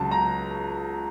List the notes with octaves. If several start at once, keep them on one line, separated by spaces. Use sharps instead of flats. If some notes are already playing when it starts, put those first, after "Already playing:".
Already playing: C#2 C#3 F#3 A5
A#5